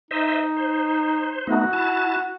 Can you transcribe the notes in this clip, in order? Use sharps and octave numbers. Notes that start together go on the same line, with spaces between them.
D#4 C5 D#5 E5
C5
A3 B3 D#4 F#4
E4 A5